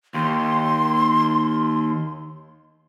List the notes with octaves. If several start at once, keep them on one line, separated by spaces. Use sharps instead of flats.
D#2 C6